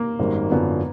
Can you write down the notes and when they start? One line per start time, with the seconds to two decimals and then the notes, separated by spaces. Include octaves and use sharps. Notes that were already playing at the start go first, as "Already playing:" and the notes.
Already playing: A#3
0.19 G#1 F#2 D#3 G3
0.51 G#1 F#2 D3 F3 B3